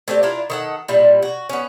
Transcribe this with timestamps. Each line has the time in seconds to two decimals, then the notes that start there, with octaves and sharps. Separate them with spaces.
0.08 A3 C4 G4 D5
0.23 D4 E4 F4 A#4
0.50 D#3 A4 F#5
0.88 A#2 G3 E4
1.22 F#4
1.49 B3 C#4